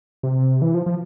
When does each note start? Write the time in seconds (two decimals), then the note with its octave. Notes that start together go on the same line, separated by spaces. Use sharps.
0.23 C3
0.62 E3
0.74 F3
0.86 F3